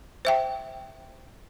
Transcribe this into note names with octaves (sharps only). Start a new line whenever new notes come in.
C5 E5 G5